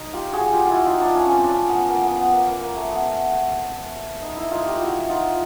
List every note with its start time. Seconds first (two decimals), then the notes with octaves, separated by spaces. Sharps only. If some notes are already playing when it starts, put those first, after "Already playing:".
Already playing: D#4
0.13 F4 G4
0.33 F#4 G#4
0.52 F4 G4
0.66 F4
0.71 E4 F#4
0.86 D#4 F4
1.01 D4
1.15 C#4
1.25 C4 C#4
1.44 D4
1.50 C#4
1.69 B3
1.88 A#3
2.03 B3
2.17 B3
2.33 A#3
2.47 A#3
2.61 A#3
2.76 A3
2.91 B3
4.22 D#4
4.36 E4
4.51 D#4 F4
4.66 F4 G4
4.81 E4 F#4
5.09 D#4 F4